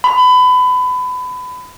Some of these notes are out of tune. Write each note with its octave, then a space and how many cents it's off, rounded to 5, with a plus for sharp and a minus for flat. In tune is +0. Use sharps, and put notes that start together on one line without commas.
B5 +25